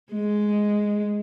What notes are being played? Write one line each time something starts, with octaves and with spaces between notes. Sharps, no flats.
G#3